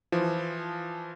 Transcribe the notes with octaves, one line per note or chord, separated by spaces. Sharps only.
E3 F3